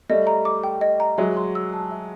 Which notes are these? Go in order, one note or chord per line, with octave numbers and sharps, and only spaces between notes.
G3 A3 D#5
A#5
D6
G5
D#5
A#5
F#3 G#3 E5
C6
E6
A5
E5